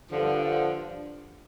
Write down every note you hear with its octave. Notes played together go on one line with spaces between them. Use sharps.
G2 D3 F3